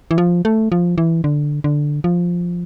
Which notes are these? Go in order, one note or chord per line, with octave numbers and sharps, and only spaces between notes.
E3
F3
A3
F3
E3
D3
D3
F3